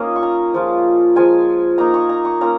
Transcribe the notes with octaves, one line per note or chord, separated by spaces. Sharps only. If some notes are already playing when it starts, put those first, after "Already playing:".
Already playing: A#3 C#4 D#4 F4 C#5 D#5 F5
C#6
A#5
F3 G#3 F4
F3 G#3 F4 G#5
A#3 D#4 A#5
C#6
A#5
C#6
A#3 C#4 F4 A#5